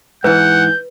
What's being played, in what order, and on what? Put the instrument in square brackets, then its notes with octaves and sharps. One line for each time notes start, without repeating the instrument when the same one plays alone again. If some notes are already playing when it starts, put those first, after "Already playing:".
[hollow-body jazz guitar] G#2 E3 [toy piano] B4 [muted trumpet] F#5 [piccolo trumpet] G6